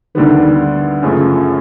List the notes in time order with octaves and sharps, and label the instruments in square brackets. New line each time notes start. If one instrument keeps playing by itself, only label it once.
[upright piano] D2 D3 G3 B3 [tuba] D#3
[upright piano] F#2 C#3 F3 A3